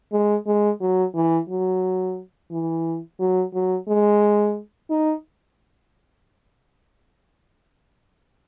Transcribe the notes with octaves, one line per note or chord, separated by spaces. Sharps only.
G#3
G#3
F#3
E3
F#3
E3
F#3
F#3
G#3
D#4